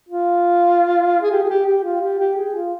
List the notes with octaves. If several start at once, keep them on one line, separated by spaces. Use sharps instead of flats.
F4
G#4
G4
G#4
G4
G4
F4
G4
G4
G#4
F4